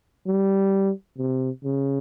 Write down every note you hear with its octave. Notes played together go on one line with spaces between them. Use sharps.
G3
C3
C#3